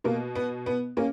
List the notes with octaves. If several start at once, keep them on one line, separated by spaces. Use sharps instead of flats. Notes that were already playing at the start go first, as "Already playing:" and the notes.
B2 A#3
B3
B3
A#3 C#4